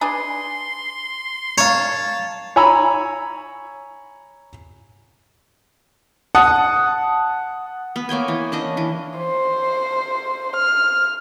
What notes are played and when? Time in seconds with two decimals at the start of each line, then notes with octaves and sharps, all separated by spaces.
0.01 D4 G#4 B4 C6
1.58 A#4 C#5 F5 A5
2.56 C#5 G#5 A#5 B5 E6
6.35 F#5 A5 D#6
7.96 B3
8.09 A#3 C#5 G5 G#5
8.28 E3
8.52 C#4 D4 D#5
8.77 E3
9.18 C5
10.56 F6